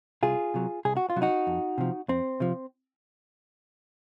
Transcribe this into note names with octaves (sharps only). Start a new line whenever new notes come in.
C2 F4 G#4
C3 F#3
C2 G#4
F#4
F4
C3 F#3
D#4 F#4
F2
C3 F3
F2 C4
C3 F3